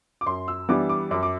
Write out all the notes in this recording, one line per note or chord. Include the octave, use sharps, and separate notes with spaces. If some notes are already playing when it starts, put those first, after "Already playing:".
D6
F#2 C6
E6
E3 G3 B3 D4 D6
D6
F#2 D6
D6